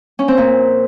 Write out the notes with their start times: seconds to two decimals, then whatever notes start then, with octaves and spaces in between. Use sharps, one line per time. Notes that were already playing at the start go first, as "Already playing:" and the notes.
0.19 C#4
0.28 C4
0.37 A#2